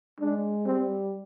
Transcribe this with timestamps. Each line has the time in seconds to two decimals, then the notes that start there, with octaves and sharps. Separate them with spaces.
0.20 G#3 D4
0.66 G3 C4